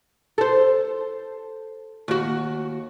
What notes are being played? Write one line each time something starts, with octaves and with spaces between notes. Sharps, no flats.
A4 C5
D#2 F#4